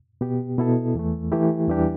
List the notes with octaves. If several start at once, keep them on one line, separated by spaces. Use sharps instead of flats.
B2 B3 G4
B2 B3 E4 A4
E2 E3 A3
E3 A3 E4 G4
E2 E3 G3 D4 G4